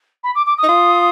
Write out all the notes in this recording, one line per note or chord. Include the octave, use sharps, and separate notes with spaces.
B5
D6
D6
D#6
D#4
F4